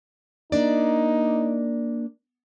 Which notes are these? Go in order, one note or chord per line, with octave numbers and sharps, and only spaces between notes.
A#3 D4 D#4 D5